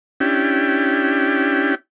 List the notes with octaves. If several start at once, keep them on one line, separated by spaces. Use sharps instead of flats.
C#4 D4 E4 G4 G5